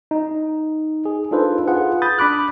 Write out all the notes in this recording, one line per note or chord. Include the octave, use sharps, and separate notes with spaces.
D#4
G#4
D4 D#4 F4 A4 B4 C5
F4 G#4 B4 F#5
B5 D#6 G6 A6
D4 B5 D6 F#6